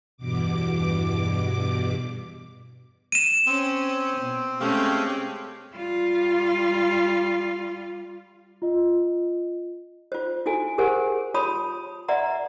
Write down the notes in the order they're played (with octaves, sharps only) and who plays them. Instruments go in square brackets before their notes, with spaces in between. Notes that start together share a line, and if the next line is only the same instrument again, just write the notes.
[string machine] E2 G2 B2 D6
[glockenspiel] D#7 E7
[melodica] C4 [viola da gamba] C#4
[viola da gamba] B2
[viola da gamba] G#3 C4 C#4 [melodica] A3 G4 F5
[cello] G3 F4
[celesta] F4 D#5
[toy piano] F4 C5
E4 F#4 A4 G#5
G4 G#4 A#4 C5 F#5 G#5
F4 C#5 A5 B5 C6 D#6
B4 D5 E5 F#5 A#5 C6